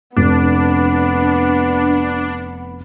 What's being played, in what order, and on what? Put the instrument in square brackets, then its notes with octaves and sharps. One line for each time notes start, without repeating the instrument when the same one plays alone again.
[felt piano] F1 [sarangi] B3 [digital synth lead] D4